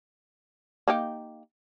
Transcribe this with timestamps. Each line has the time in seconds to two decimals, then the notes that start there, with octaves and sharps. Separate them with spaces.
0.88 A#3 D#4 G4